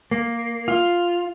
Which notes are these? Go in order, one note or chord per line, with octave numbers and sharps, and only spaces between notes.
A#3
F4